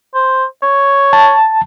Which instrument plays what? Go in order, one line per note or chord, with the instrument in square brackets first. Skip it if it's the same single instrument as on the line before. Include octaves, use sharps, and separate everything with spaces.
[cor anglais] C5
C#5
[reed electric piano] A5